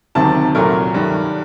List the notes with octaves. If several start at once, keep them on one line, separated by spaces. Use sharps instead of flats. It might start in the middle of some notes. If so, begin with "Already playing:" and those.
D2 C3 D#3 F#3 A5
C2 A#2 F#3 A3 A#4
G2 D#3 F#3